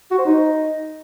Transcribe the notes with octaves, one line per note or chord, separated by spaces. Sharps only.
F#4
C5
D#4